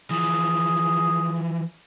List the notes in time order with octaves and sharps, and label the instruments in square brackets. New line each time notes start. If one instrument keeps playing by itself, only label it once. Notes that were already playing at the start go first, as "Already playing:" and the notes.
[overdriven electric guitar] E3 F3 [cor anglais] G#4